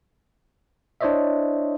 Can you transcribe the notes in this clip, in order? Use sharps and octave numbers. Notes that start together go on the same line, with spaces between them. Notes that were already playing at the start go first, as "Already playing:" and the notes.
D4 E4 C5 C#5 D#5 E5